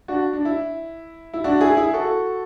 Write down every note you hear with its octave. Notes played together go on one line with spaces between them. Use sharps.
D4 F#4
D4
E4
E4
D4 F#4
E4 G#4
E4 G#4
F#4 A4